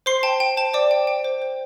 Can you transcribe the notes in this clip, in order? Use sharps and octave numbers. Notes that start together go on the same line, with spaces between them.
C5 C6 C7
G5 A5
G5
C5 A5
C5 D5 D6
G5
G5
C5
C5